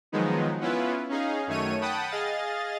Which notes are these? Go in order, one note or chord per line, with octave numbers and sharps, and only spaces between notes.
D#3 F3 F#3 G#3 B3 D#4
B3 C#4 E4 F4 B4
C#4 D#4 G#4 F5
F#2 D#3 A3 C#5 D#7
F#5 G5 A5 B5 D#6
G#4 D#5 F5 A6